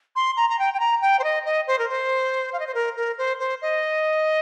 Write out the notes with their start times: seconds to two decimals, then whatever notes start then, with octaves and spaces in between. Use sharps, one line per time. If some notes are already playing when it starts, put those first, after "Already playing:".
0.16 C6
0.37 A#5
0.49 A#5
0.59 G5
0.74 G5
0.80 A#5
1.01 G5
1.19 C5
1.24 D#5
1.46 D#5
1.67 C5
1.79 A#4
1.89 C5
2.53 F5
2.59 D#5
2.67 C5
2.74 A#4
2.97 A#4
3.18 C5
3.39 C5
3.62 D#5